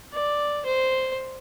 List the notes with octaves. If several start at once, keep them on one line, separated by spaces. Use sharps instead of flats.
D5
C5